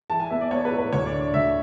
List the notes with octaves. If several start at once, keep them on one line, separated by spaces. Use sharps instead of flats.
E3 A5
G#5
B3 E5
D5
B3 C#5
B4
A2
B4
D2 C#5
D5
D3
D5
D2 E5